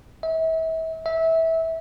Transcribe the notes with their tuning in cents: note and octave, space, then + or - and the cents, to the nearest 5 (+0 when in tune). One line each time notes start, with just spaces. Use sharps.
E5 -35
E5 -20